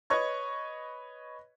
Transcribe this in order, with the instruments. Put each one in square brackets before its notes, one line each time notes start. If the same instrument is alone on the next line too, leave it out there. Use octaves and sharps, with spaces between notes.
[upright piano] B4 C#5 D#5 C#6 G#6